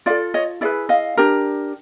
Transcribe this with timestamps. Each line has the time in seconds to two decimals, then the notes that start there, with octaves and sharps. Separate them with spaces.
0.06 F4 D5 E5
0.10 A4
0.34 C#5 D#5
0.61 E4 G#4 B4 D5 E5
0.89 D#5 F5
1.17 D4 G4 A#4